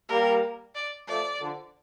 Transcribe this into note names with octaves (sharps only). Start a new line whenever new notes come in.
G3 A#3 A#4
D5
F3 A3 D5
D3 F3